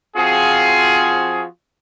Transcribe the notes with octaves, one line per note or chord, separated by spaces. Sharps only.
F3 C4 F4 F#4 G#4